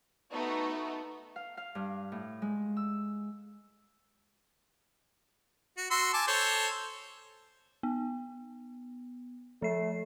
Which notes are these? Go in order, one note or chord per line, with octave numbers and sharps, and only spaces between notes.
A3 B3 D#4 F#4
F5
F5
G2
A2
G#3
E6
F#4
F#4 C6 E6
G#5 A5 D6
A4 C5 C#5
B3
F3 A3 C7